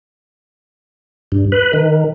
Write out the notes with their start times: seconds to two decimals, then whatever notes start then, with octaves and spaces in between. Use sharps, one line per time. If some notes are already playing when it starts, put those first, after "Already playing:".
1.32 G2
1.52 B4
1.73 D#3